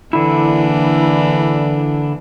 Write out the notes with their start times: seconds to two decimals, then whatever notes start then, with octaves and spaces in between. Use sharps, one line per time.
0.13 D3 E3 A#3 D4 E4